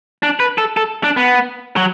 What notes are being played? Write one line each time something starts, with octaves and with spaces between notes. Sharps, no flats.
D4
B4
A4
A4
D4
B3
F#3